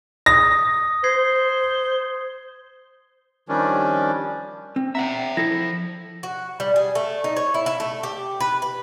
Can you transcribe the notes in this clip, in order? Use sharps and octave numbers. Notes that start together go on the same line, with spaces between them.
D#6 A#6
C5 G#6 C7
D#3 F3 G3 C#4 D4
C4
D5 E5 F#5 G5 A#5
F3 E4 A4 A#6
F#4
G3
G#4
A3
D#4
C#5
E4
E4
A3
G4
B4
B4